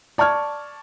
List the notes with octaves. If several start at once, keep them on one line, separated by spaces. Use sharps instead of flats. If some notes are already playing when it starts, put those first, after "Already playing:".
D5 A5 C#6 F6 G#6